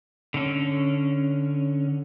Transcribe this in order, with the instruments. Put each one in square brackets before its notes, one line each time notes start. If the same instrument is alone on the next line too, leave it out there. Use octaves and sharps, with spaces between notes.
[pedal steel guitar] D3 C#4